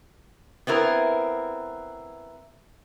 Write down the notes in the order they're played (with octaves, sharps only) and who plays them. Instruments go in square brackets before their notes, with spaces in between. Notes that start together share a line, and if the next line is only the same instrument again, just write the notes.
[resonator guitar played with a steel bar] B3 C4 E4 A#4